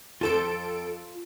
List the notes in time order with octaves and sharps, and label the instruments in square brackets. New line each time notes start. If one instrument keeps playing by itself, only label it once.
[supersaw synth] F2 A4 D7 [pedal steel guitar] F4 A5 C6